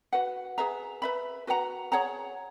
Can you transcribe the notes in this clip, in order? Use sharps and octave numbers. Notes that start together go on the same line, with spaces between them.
F#4 B4 F#5
G#4 B4 E5 A#5
B4 E5 B5
F#4 B4 F#5 A#5
G#4 C#5 F#5 A#5